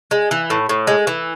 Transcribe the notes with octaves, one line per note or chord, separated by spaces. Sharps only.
G#3
E3
A2
A2
G#3
E3